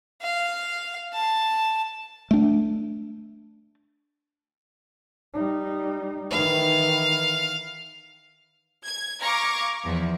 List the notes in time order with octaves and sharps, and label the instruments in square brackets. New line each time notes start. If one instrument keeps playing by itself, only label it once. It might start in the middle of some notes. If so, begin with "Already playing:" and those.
[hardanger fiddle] F5
A5
[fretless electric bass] A3 D4
[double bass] G3 D#4
[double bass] D#3 E3 [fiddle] F5
[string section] G#6
F5 A#5 C#6 D6 G#6
E2 F3